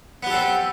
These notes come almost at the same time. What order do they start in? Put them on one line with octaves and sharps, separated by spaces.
B3 G4 A4 C4